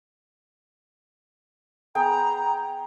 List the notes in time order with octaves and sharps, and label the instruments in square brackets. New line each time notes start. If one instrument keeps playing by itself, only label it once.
[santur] B3 G#4 G5 [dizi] A#5